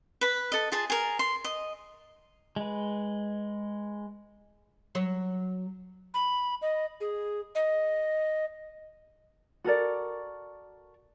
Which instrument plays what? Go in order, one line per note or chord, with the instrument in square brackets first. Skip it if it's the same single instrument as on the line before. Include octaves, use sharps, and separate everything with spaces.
[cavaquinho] B4 B5
A4 D#5
F4 G#4 A5
G#4 A#4
C6
D#5
[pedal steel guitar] G#3 B4
[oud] F#3 C#5
[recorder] B5
D#5
G#4
D#5
[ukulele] F#4 A4 A#4 D5